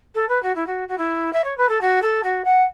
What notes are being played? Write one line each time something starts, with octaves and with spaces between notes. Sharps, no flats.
A4
B4
F#4
E4
F#4
F#4
E4
E5
C#5
B4
A4
F#4
A4
F#4
F#5